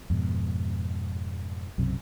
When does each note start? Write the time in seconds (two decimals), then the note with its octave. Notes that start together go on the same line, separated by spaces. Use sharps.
0.10 F2 G#2 B2
1.78 B1 F#2 C3